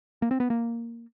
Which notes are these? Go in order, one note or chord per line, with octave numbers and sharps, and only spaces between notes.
A#3
C4
B3
A#3